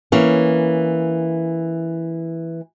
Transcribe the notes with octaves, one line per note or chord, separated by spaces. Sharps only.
E3 A#3 C#4